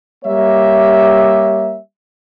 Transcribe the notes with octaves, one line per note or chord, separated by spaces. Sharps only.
G3 A#3 G4 C#5 E5